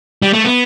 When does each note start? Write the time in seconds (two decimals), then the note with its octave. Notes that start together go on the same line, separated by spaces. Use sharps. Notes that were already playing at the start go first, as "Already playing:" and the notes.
0.22 G3
0.33 A3
0.44 B3